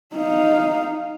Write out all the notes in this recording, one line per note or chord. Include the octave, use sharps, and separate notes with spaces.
D#4 F5